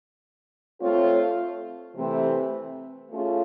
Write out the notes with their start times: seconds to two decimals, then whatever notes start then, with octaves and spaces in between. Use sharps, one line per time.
0.81 A3 C4 F4 A4 C#5
1.95 C3 E3 A3 C4
3.10 A3 C#4 F4 G#4